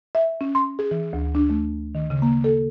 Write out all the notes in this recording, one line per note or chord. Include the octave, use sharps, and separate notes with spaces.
E5
C#4
C6
G#4
E3
D2
D4
A3
D#3
C#3
A#3
A4